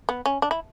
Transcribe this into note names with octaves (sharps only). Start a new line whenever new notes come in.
B3
C#4
D4
E4